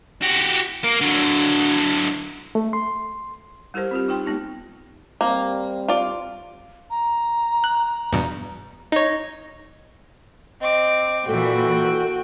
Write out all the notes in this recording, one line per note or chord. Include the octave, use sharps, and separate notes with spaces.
F#4 G4
A#3 A#4
D3 F#3
A3
C6
G3 E4 G4 A#4 C5
C4 F4 G4
D#4 F4 G5 C6
G#3 B3 D#4 G4
G3 A#3 C4
F4 D5
A#5
F#6
E2 G2 B2
D#4 C#5 D#5
C4 D#5 D6
A#2 E3 F#4 A4 G5